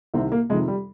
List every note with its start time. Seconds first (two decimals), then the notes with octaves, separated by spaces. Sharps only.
0.14 C2 C3 D#3 C4
0.32 A#3
0.50 F2 C3 D#3 G#3
0.68 G3